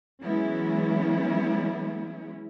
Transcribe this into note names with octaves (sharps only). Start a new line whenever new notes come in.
E3 F#3 G#3 B3 C#4 E4